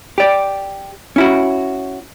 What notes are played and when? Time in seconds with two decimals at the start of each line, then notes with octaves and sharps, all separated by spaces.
0.18 G4 D5
1.16 C#4 E4 F#4